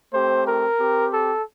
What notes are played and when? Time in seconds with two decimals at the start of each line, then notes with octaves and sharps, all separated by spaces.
0.12 A3 C4 G4 C5
0.46 A#4
0.79 C4 G4
1.12 A4